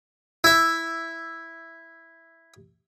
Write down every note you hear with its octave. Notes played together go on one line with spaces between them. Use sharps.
E4 E5